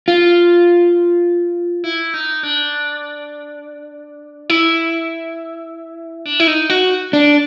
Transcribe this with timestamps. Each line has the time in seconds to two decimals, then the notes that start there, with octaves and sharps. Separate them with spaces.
0.08 F4
1.84 E4
2.14 D#4
2.43 D4
4.50 E4
6.26 D4
6.40 E4
6.47 D#4
6.70 F#4
7.13 D4